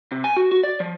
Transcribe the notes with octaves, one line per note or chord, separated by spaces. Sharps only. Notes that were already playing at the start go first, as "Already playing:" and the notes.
C3
G#5
F#4
F#4
D5
F3